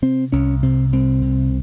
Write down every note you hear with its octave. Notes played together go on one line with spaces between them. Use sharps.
C3 C4
C2 C#4
C3 C4
C2 C4
C3